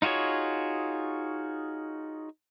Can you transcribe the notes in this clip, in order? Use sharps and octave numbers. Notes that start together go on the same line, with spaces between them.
D#4 F4 F#4 G#4 C#5